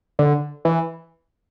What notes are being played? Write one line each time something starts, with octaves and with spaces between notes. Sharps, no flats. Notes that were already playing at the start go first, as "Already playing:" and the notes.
D3
E3